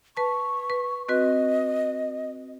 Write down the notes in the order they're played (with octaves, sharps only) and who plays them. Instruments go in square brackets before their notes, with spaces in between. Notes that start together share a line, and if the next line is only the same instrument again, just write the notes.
[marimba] B4 A5 [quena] C#6
[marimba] B4
[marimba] C4 F#4 B4 [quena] D#5